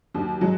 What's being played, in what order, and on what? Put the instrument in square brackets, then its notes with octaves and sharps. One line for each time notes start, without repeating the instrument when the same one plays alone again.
[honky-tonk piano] D#2 [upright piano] F#3
[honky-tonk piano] F#3 [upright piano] G#3